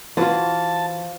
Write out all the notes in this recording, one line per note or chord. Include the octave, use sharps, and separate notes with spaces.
E3 F4 F#4 B4 C5 A5